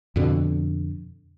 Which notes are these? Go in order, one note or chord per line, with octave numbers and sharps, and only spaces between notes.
F2 B2 D3